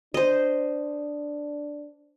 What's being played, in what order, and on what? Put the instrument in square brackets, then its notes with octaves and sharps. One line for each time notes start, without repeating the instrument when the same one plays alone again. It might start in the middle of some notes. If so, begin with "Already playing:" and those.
[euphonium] D4 [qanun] C5 D#5